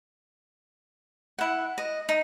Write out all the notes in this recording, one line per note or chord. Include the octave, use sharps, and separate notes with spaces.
E4 F#5
D#5
D#4